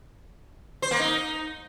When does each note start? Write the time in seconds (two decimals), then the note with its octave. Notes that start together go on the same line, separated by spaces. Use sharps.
0.82 C5
0.91 A#3
1.00 D#4